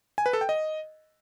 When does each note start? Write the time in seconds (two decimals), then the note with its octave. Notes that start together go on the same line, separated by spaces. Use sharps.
0.18 G#5
0.26 B4
0.33 A4
0.41 G5
0.49 D#5